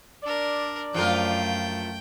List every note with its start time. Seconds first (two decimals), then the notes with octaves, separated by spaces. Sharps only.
0.23 D4 A#4 D5
0.94 F#2 F3 A3 F4 A#4 G5